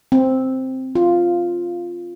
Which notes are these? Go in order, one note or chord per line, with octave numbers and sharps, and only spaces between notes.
C4
F4